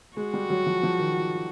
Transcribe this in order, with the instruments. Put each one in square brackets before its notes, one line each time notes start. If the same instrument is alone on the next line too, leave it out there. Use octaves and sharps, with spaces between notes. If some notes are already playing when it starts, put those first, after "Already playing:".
[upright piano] G#3 [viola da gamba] F#4
[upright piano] G3
F#3
F3
F3
D#3